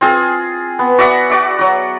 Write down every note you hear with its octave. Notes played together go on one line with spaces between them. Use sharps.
C4 F4 G#4
B3
F#4 D5 E5 F#5
F#4 D5 E5
F#3 F#4